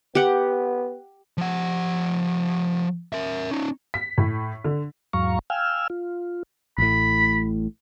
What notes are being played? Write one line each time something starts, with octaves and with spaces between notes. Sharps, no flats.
B3 G4 F#5
F3 F#5
A#4 E5
C#4 D#4
B6
A2
D3
E2 G#2 F#3 F5 A#5 C#6
F5 G5 G#5 E6 F6
F4
A1 A2 B5